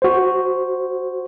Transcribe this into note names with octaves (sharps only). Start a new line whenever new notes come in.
F#4 C5